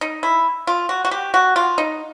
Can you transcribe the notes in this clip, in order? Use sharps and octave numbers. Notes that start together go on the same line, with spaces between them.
D#4
E4
F4
F#4
F#4
G4
F#4
F4
D#4